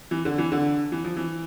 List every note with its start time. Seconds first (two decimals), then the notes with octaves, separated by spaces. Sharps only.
0.11 E3
0.25 D3
0.38 E3
0.52 D3
0.92 E3
1.04 F3
1.16 E3